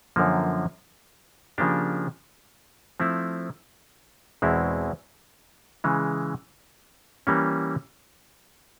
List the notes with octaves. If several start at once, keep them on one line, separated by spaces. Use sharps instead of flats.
F#2 D3 F3 A#3
C#3 F3 A#3 D4 G4
F3 A3 C4 E4
E2 B2 G#3 C4 E4
C#3 E3 G#3
E3 G3 A#3 C#4